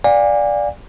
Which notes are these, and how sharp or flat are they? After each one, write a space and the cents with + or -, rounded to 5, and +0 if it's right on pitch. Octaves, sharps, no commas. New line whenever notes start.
D5 +0 F5 +45 G#5 -35